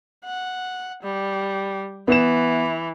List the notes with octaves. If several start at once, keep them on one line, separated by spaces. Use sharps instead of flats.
F#5
G3
E3 B3 E7